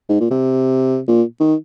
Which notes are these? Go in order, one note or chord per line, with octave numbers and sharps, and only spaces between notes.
G#2
A#2
C3
A#2
D#3